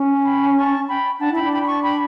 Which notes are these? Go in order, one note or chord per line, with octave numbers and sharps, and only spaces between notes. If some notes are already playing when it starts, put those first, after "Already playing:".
Already playing: C#4
G5 B5
A5 C#6
G5 B5
D4 F#5 A5
E4 G5 B5
D4
G5 B5
B5
A5 C#6
G5 B5